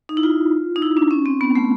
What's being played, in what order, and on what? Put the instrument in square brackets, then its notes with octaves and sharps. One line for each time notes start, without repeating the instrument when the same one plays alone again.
[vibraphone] D#4
E4
F4
D#4
E4
D4
C#4
C4
B3
A3